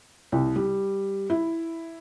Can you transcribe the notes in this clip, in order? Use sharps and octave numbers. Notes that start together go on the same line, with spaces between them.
C2
G3
E4